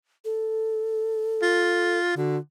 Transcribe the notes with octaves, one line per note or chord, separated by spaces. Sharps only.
A4
F4
D3 F#4